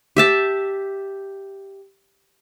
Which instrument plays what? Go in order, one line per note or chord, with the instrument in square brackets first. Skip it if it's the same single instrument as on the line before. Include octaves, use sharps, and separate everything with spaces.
[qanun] G4 E5 A5